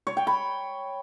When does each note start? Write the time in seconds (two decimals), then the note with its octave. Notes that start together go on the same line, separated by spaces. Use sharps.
0.07 C#5
0.17 G5
0.27 B5